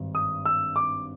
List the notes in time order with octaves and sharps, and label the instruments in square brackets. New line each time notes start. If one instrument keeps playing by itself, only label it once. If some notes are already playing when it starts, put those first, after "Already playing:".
Already playing: [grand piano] G#1 G2
D#6
E6
D6